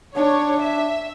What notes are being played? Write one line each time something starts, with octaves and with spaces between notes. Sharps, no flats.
D4 C#5
E5